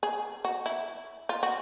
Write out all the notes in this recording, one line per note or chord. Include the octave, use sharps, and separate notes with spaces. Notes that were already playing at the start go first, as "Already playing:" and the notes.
G#4
F#4
E4
F4
F#4